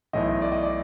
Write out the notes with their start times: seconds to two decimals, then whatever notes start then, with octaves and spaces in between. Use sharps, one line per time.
0.13 B1 A2 E3 D#5
0.42 D5
0.52 D#5
0.62 D5